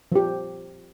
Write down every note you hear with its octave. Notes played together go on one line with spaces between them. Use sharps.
F3 G4